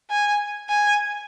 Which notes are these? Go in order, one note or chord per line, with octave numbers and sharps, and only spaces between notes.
G#5
G#5